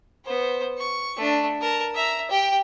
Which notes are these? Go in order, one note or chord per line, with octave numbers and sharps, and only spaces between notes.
B3 C5
C#6
A3 D4
A#4 A5
E5 A#5
G4 G5